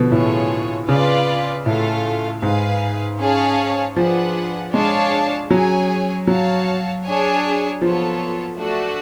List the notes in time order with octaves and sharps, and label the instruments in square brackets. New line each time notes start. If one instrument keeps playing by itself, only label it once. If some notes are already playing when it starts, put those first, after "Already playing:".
Already playing: [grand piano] B2 D3 F3
[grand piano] A2 [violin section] A3 F4 G#4 C#5
[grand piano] C#3 [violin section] F4 B4 D5 F5
[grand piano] A2 [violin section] A3 F4 A4 F5
[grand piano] G#2 [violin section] G#4 B4 F5
[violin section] C#4 G#4 C#5 F5 A5
[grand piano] F3 [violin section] D4 F4 G#4 B4 F#5
[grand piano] G#3 [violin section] D4 G#4 C#5 F5 A5
[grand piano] F#3 [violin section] C#4 G#4 C#5 G#5
[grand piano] F#3 [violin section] F#4 C#5 F5 A5
[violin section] D4 G#4 C#5 G#5
[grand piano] F3 [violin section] B3 F4 A4 C#5
[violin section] A3 D4 F#4